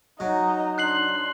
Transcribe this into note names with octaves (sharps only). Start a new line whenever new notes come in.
F#3 D#4 D#5 A#5
D4 C6 F#6 C7 F#7